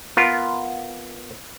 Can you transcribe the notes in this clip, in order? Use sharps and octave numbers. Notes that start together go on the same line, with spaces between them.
B3 F4 A#4